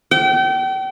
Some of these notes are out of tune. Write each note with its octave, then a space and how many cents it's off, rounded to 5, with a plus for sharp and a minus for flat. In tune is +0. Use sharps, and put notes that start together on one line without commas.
G5 -35